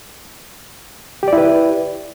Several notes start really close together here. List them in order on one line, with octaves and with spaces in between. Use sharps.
G4 D5 E4 B4